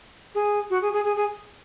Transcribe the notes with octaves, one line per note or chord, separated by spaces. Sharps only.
G#4
F#4
G#4
G#4
G#4
G#4